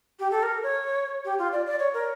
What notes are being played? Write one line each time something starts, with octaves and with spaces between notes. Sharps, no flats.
G4
A4
A#4
C#5
G4
F4
D5
D5
C#5
A#4